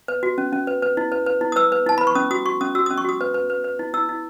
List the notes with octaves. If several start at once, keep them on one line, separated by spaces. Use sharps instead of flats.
B4
F#4
C#4
C#4
B4
B4
E4
B4
B4
E4
D#6
B4 E6
B4
E4 A5
B4 B5
C#6
C#4 D#6
F#4 D#6
F#4 C#6
C#4 D#6
F#4 E6
C#4 D#6
C#6
F#4 D#6
B4
B4
B4
B4
E4
E4 E6
E4